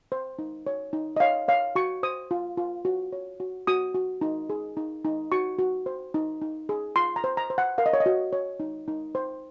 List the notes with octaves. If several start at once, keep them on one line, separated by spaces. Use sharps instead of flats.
C5
D#4
C#5
D#4
D#5
C#5 F5
C#5 F5
F#4 C#6
C5 D#6
F4
F4
F#4
C#5
F#4
F#4 D#6
F#4
D#4
G#4
D#4
D#4
F#4 C#6
F#4
C5
D#4
D#4
G#4
F4 C6
A#5
C5
A#5
C5
F#5
A#4 F5
D#5
C#5
D#5
F#4
C#5
D#4
D#4
C5